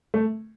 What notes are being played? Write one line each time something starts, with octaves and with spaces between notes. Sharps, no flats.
A3